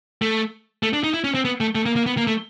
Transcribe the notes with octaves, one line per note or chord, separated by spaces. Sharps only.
A3
A3
D4
D#4
E4
C#4
C4
B3
A3
A3
A#3
A#3
B3
A#3
A3